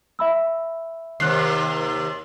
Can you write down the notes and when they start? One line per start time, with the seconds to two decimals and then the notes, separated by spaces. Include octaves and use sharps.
0.19 E5 B5 E6
1.20 D#2 C3 F6 F#6 C7